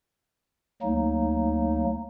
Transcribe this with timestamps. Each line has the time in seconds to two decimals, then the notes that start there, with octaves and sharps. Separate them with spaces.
0.82 D2 F#3 A#3 D#4